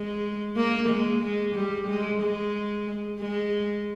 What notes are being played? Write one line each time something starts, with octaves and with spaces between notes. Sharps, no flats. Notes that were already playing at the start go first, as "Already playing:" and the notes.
Already playing: G#3
A#3
G#3
G#3
G3
G#3
G#3
G#3